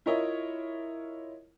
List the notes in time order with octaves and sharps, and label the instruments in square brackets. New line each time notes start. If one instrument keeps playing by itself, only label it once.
[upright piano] E4 F4 A#4 C#5 D#5 E5